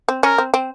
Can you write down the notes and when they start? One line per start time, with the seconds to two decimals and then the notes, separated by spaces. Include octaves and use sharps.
0.08 C4
0.23 C#4 A#4
0.38 C4
0.54 C4